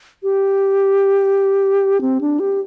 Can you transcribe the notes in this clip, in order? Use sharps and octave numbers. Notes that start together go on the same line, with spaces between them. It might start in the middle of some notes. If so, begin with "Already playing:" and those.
G4
C4
D4
G4